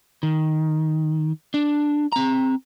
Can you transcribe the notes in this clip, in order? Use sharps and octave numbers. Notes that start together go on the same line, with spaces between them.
D#3
D4
C4 A#5